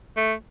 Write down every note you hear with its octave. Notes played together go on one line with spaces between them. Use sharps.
A3